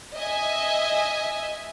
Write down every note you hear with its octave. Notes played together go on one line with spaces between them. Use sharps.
D#5 E5 G#5